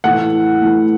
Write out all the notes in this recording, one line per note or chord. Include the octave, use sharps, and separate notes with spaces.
A2 E3 A3 F#5
A2 E3 A3